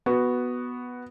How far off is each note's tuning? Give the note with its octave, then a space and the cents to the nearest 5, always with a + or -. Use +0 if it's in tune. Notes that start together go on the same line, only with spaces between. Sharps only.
B3 +0 F#4 +0